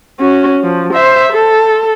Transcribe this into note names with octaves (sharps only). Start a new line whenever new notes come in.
C#4 F#4
F3
C5 E5
A4